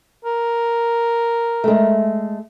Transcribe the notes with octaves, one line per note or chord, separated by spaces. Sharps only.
A#4
G#3 A3